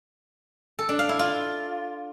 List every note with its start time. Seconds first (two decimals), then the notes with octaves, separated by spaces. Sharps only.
0.79 A4
0.89 D4
0.99 F5
1.09 E4
1.19 F4